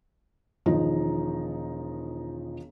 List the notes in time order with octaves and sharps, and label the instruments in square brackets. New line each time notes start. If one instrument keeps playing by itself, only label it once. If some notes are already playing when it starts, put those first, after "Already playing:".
[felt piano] E1 D#3 F3 D#4 A#5